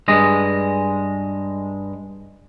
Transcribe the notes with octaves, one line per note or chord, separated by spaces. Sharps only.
G2 G#3 D#5